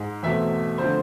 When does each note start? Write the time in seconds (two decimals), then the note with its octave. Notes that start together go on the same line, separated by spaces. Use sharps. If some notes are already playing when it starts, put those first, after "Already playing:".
Already playing: G#2 G#3
0.23 E2 B2 A3 C4 E5
0.78 D3 F3 A3 C4 C5